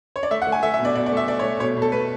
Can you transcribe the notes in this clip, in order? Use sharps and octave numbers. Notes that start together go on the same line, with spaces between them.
C#5
D5
A3 E5
F#5
A3
G#5
A3 E5
E5
B2
D5
B2 D5
D5
A3 E5
A3 D5
C#5
A3
B2 C#5
B2
A4
A3 B4